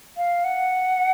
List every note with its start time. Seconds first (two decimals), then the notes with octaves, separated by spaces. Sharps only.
0.17 F5
0.44 F#5